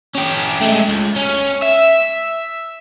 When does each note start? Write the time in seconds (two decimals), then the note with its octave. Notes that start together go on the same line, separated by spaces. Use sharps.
0.15 C#4 G4
0.61 G#3 A3
0.89 C#2
1.16 C#4
1.62 E5